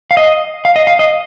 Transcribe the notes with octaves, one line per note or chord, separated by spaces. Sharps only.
F5
D#5
F5
D#5
F5
D#5